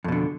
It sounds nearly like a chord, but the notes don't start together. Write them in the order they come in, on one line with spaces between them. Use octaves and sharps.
F2 B2 D3